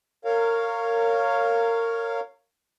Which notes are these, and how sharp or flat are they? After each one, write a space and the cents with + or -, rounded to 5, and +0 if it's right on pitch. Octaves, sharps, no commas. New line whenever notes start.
A#4 -25 C#5 +0 F5 +0